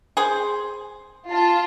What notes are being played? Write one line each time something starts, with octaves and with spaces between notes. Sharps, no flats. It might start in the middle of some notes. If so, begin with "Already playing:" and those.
G#4 C5
F4 A5